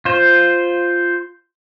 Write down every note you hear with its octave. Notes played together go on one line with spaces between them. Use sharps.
F4 C5